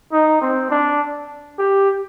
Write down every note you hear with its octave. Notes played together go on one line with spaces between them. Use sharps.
D#4
C4
D4
G4